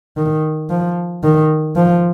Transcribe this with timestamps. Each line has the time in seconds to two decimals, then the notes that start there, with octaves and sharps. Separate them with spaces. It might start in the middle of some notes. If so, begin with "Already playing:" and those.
0.17 D#3
0.70 F3
1.24 D#3
1.76 F3